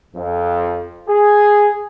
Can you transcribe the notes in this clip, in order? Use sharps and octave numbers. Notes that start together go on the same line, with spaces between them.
F2
G#4